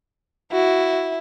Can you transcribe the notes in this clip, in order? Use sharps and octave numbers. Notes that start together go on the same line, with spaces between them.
E4 F#4